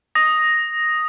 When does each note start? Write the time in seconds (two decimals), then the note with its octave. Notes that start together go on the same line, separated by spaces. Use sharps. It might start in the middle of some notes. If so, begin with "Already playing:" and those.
0.15 D#6 A#6